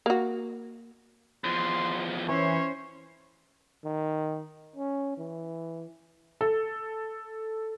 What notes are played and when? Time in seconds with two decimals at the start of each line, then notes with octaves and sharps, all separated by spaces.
0.06 A#3 F#4
1.44 E2 F3 C6
2.29 E3 C#4 C5 C#5
3.85 D#3
4.76 C#4
5.18 E3
6.41 A4